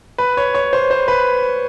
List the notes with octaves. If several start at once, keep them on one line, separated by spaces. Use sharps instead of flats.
B4
C#5
C#5
C5
C5
B4